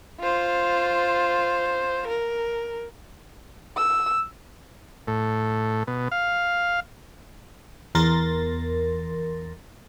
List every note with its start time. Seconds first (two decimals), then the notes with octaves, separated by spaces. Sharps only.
0.21 F4 C5
2.08 A#4
3.77 E6
5.07 A2
5.87 B2
6.11 F5
7.95 E2 A#4 C6 A6 A#6